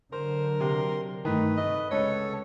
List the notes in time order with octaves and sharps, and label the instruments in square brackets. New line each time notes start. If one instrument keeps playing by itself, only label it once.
[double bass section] D3 F#3 [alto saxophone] A#4 [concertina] C5 [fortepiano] C6
[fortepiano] C3 [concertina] C6
[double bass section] G2 A3 [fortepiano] D#3 [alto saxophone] D#4 [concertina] B4
[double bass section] C3 [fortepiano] A3 [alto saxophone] D#5
[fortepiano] C#2 C#4 B4 [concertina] A4 [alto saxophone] C#5